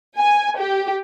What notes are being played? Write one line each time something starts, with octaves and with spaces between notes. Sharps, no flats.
G#5
G4